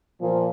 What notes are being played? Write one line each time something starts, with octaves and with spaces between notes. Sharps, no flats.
A#2 F3